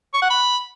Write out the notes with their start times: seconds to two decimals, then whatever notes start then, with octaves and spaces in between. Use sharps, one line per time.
0.14 C#6
0.22 F#5
0.30 B5